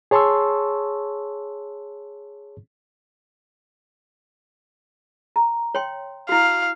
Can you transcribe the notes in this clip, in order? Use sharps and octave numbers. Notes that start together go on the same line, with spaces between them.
G#4 C#5 A5 C6 C#6 E6
A#5
C#5 G5 C6
E4 F#4 F5